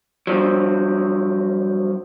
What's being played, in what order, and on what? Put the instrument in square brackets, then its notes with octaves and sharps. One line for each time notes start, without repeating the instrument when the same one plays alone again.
[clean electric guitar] G2 F3 F#3